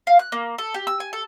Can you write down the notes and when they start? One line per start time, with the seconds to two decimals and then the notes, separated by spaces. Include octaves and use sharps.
0.07 F5
0.19 F#6
0.32 A#3
0.58 A4
0.74 G4
0.87 E6
1.00 G#5
1.13 A4